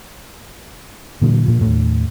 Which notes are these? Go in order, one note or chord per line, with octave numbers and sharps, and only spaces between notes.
A#2 D3 E3 F#3
A#2 F3
D#2 A2